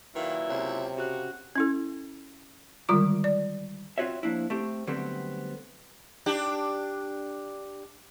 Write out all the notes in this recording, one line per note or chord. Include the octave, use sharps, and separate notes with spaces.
A#2 D#3 F#3 E4 B4 E5 F5
C#2 C3 F4 C#5
C#3 C#4 F#4 G4 F#6
C#4 E4 A4
D3 D#3 G3 G#3 F4 D6
D5
C4 F4 F#4 C#5 E5
F3 A#3 D4 E4
A3 C4 G4
D3 F#3 G3 A3 B3 C4
D4 G4